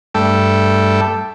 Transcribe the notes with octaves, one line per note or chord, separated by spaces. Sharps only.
G2 A3 A4 G5